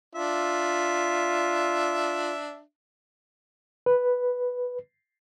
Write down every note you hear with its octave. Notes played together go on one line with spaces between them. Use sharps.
D4 F4 E5
B4